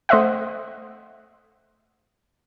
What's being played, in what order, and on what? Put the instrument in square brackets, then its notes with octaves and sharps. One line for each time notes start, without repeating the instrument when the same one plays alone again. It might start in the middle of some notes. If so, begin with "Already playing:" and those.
[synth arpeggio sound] A3 C5 D#5 E5 F#5